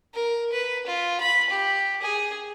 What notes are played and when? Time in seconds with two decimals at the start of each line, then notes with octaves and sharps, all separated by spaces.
0.14 A#4
0.52 B4
0.87 F4
1.21 B5
1.50 G4
2.02 G#4